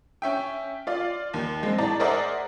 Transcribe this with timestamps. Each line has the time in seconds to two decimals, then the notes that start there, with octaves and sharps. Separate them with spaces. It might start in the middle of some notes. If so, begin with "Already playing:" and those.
0.22 C#4 E5 G5
0.87 F4 D5 F5
1.34 D#2
1.63 G#3 C4
1.78 A2 D5 A5 A#5
2.00 G#4 A#4 C5 D5 E5 F#5